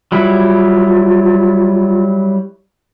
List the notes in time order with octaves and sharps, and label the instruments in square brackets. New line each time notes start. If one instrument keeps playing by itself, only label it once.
[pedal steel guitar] F#3 G3 E4 [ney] F4